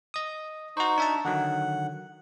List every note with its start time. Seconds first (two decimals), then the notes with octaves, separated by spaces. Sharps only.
0.14 D#5 D#6
0.77 D#4 F#4 C5 C#6
0.98 D4 E5 A5
1.25 D3 D#3 F#3 F#5